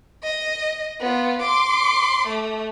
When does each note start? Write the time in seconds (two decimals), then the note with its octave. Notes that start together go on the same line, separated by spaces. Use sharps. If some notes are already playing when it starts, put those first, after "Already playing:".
0.24 D#5
1.00 B3 F4
1.42 C6 D6
2.27 A3